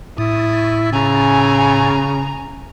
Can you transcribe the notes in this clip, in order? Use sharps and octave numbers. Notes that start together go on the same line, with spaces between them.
A2 E4 D#6
C#3 G#5 A#5